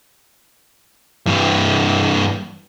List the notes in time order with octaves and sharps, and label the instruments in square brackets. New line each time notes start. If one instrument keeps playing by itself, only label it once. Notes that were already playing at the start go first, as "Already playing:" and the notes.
[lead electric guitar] G2 E3